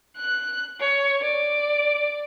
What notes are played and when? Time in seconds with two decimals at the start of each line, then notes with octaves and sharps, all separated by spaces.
0.16 F#6
0.80 C#5
1.22 D5